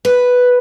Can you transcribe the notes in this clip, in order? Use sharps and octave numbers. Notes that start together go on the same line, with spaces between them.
B4